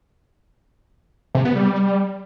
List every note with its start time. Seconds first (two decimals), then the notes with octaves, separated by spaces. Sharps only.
1.35 C3
1.45 B3
1.55 G3